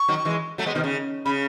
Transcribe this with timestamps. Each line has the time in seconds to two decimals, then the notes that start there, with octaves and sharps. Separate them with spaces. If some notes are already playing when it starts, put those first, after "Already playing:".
Already playing: C#6
0.08 D#3 F#3
0.25 E3 G#3
0.58 F#3 A3
0.66 G#3 B3
0.75 B2 D#3
0.84 C#3
1.25 C#3 B5